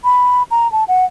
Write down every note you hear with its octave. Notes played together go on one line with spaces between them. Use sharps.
B5
A#5
A5
F#5